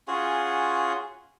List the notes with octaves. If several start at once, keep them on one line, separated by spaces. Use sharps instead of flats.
C#4 F4 F#4 G#4